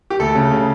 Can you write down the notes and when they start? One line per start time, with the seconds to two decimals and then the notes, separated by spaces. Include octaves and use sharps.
0.10 G4
0.19 D2 A4
0.35 C#3
0.51 C#3